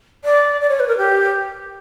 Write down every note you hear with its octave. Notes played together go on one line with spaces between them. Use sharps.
D5
D5
C#5
B4
A#4
G4